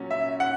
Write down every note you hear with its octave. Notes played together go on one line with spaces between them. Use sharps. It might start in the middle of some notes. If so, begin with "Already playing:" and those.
Already playing: A#2 F#3 C#4
E5
F#5